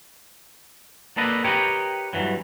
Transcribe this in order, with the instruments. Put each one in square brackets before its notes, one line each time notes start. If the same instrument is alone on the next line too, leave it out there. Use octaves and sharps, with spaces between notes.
[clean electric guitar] A#3 D4 A4 B4 D#5
G4 A#4 B4 C#5 D#5 G5
G2 C3 E3 F#3